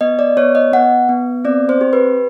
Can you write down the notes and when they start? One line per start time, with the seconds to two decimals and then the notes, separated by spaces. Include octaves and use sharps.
0.01 B3 D#5
0.19 D5
0.37 B3 C#5
0.55 D#5
0.73 B3 F#5
1.09 B3
1.45 C4 D5
1.69 C5
1.81 G4
1.93 B4